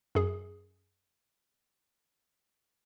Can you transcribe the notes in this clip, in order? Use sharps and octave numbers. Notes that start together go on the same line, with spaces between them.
F#2 G#4